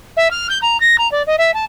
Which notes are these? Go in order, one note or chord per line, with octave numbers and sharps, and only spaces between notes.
E5
F6
G6
A#5
A#6
A#5
D5
D#5
E5
A5